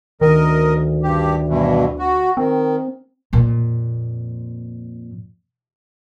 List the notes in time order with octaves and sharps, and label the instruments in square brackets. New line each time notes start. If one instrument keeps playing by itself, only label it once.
[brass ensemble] D2 [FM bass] D#3 [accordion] A#4 D#5
[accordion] G2 G4
G2 B2 E3
F#4
[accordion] D#3 [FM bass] C4
[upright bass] F2 A#2